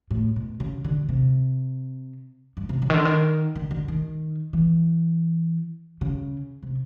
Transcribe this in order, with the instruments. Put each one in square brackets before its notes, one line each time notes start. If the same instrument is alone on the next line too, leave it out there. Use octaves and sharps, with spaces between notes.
[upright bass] A2
B2
C#3
D3
C3
G2
C3
C#3
D#3
D3
D#3
D3
D3
D#3
E3
C#3
C3